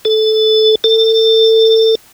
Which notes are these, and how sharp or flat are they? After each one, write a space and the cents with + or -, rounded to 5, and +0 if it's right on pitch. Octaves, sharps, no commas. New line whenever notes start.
A4 -15
A4 +25